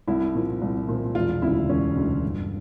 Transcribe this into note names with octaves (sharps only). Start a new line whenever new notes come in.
C2 E4
A#2 F3
C2
A#2 F3
E1 F4
D2 C#3 E4
E1 C#4
D2 C#3
G1